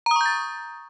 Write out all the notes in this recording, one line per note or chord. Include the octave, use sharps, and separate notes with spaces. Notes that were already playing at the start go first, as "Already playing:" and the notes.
A#5 C#6 D#6 G6 A6